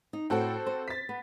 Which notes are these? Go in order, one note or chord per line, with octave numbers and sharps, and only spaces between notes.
D#4
A2 C4 F#4 A4 G5
C5
A6 B6
B3